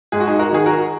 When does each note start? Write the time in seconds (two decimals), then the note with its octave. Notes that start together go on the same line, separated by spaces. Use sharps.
0.12 G#2 G#4
0.20 F#4
0.27 D#4 G#4
0.39 F#4 A#4
0.53 D#3 G#4
0.66 F#4 A#4